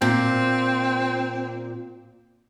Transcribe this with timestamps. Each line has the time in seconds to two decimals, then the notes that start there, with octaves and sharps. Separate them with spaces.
0.02 A#2 C4